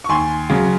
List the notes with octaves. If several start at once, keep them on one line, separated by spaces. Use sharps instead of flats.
C#6
D#2 G#5 C6
C#3 F#3